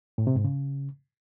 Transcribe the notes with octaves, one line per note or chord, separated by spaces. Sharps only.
A2
C3
G#2
C#3